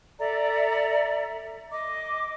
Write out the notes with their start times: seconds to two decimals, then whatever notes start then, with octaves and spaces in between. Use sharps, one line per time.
0.20 A4 D5 E5 A#5
1.71 D#5 D6